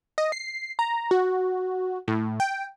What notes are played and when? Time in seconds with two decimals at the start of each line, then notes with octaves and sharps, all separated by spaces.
0.18 D#5
0.32 C7
0.79 A#5
1.11 F#4
2.08 A2
2.40 G5